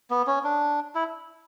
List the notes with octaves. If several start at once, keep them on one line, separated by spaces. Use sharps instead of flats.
B3
C#4
D4
E4